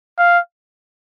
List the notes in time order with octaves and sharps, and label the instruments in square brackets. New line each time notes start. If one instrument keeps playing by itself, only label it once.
[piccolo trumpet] F5